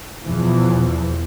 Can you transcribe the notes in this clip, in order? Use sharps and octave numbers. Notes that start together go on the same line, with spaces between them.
E2 B2 E3 F3